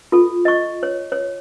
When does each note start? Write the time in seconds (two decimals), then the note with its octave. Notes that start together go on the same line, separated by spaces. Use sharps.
0.12 F4 A4
0.45 D#5 C#6
0.83 C#5
1.12 C#5